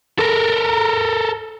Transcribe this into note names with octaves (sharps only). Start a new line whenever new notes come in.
A4 A#4